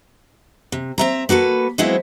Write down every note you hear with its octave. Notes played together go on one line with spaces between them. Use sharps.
C3
C4 E5 A#5
A#3 F#4 A4 B4
F3 F#3 G#3 B3 C4 E4